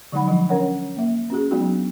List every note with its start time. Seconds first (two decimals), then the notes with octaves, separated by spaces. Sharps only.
0.12 D3 F#3 G#3 D#4 F#5 B5
0.28 F3 G#3 D4
0.49 C#4 A#4 C#5 F#5
0.97 A#3 E5
1.30 C#4 F#4 G#4
1.51 F#3 G#3 B3 D4 D#4 F#4